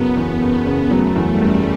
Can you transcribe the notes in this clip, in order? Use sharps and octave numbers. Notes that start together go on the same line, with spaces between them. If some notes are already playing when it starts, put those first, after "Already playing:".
Already playing: F#1 C#3 F#3 B3
E2
F#1
C#3
F#3 A3
E2
G3
F#1